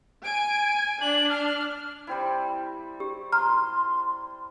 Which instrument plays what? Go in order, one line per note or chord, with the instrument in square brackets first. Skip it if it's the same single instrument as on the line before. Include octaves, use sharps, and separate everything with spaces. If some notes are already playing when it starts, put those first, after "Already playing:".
[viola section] G#5 [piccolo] D7
[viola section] D4 [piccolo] F#7
[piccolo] F6
[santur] G3 C4 E4
[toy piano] G4
[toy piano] A#5 [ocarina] C6 [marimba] F6